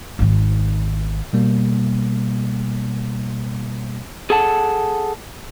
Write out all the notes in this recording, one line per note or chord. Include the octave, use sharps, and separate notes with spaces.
G#1 D#3
B2 G3 A#3
G#4 A4 F#5 A5